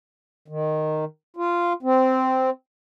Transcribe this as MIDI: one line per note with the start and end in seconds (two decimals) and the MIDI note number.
0.48 1.05 51
1.36 1.73 65
1.83 2.50 60